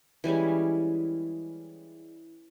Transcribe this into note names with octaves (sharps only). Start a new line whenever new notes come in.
E3 G3 G#3 C#4